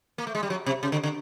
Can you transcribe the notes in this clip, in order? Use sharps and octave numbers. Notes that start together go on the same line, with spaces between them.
A#3
A3
G#3
G3
F#3
C3
C#3
D3
D3